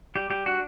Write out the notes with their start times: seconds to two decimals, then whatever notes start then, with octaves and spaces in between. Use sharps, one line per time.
0.15 G3 G4
0.30 G3 G4
0.46 D4 F#4